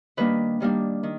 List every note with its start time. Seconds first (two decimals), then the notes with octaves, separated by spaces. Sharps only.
0.17 D#3 G3 A#3 D4 B4
0.60 D#3 G3 A#3 D4
1.03 D#3